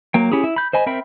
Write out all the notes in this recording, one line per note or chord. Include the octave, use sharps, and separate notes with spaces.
F#3 A#3 G5
C#4 E4 G4 G#4
E4
B5 G6
C5 D#5 G#5 B5
C4 A#4 E5 G5 B5